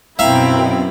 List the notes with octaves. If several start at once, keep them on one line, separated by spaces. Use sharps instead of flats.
F#2 B2 C4 E4 E5 F5 G5 A#5